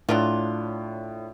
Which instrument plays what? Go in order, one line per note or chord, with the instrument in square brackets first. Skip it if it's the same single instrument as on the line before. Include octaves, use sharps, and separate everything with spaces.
[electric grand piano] A2 [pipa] F#3 D4 F4